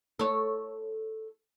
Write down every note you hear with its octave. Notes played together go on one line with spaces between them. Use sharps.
A4 C#5